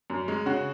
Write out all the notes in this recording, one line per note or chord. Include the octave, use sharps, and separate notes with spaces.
F#2
G#3
C#3 F#4